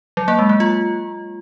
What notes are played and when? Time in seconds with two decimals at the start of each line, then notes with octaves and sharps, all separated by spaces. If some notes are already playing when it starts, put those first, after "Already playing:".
0.17 F#3
0.28 A#3
0.39 G#3
0.49 A#3
0.60 F4